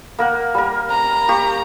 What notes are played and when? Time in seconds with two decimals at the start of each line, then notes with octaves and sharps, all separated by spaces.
0.19 A#3 A#4 F#5
0.54 G3 A#4
0.90 A#5
1.28 A#3 G4 C#6